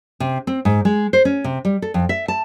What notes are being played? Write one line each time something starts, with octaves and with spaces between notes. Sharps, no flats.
C3
C4
G#2
G#3
C5
C#4
C3
G3
A4
F2
E5
A5